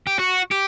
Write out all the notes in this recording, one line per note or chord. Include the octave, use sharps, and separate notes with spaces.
G4
F#4
G4